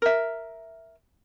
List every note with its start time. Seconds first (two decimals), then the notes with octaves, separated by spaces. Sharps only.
0.02 A#4 E5